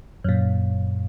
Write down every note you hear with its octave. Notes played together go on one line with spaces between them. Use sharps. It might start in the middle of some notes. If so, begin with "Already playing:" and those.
F#2 A#2